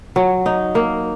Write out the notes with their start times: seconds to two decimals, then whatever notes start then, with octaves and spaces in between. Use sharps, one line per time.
0.16 F#3
0.46 D#4
0.75 A#3